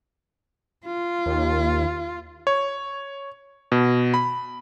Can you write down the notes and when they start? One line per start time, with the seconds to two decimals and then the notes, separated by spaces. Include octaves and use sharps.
0.86 F4
1.26 D#2
2.47 C#5
3.72 B2
4.14 B5